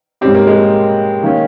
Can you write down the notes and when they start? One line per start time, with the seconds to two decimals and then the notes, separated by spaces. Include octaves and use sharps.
0.21 G#2 G3 C4 C#4 G4
0.35 A#3
0.47 G#3
0.58 A#3
1.23 D#3 A#3 C#4